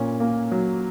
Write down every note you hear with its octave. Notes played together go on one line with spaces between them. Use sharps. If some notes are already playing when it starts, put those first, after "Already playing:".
Already playing: A#2 C#4
A#3
F#3